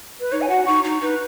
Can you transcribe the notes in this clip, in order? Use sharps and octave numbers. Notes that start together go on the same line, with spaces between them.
B4
D#4 C#5
G#5
F#4 F#5
D#4 C#6
D#4
D#4 B4